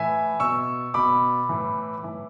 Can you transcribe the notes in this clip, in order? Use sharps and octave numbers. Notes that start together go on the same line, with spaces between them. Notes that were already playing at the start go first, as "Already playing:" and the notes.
Already playing: A2 E3 E5 G#5
B2 C#6 E6
B2 B5 D6
A2 E3
A2 E3